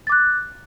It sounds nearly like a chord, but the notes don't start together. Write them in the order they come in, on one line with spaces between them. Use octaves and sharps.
A6 D6 F#6